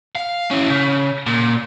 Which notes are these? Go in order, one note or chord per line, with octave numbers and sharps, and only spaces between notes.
F5
C#4 E4
C#3
A#2